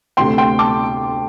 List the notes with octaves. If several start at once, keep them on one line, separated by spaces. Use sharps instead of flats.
D2 C3 A3 G5 C6
G5 C6
A5 D6